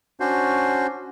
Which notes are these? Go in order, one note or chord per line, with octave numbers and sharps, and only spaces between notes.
C#4 D4 F#4 C5